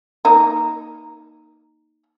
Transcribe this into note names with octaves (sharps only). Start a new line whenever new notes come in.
A#3 D#4 A#4